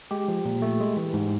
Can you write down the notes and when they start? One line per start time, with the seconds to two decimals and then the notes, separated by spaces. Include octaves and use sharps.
0.11 G#3 G4
0.28 F3
0.45 A#2
0.62 A3
0.80 G#3
0.97 E3
1.14 G#2